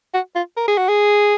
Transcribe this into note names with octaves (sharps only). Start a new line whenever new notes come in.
F#4
F4
A#4
G#4
F#4
G#4